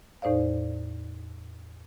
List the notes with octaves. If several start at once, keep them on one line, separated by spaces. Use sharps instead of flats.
E2 A2 D#4 C5 D5 F5